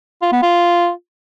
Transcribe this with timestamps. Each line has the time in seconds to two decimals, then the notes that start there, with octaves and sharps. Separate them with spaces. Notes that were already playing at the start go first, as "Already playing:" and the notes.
0.22 F4
0.32 B3
0.42 F4